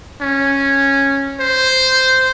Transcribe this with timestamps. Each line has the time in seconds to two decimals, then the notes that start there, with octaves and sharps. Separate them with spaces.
0.21 C#4
1.40 C5